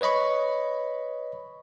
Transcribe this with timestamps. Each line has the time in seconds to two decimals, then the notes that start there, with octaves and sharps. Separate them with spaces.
0.01 B4 C#5 D#5 B5 C#6